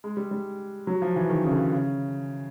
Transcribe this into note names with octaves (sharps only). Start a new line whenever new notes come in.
G#3
G3
G3
F#3
F3
E3
D#3
C#3
D3
C#3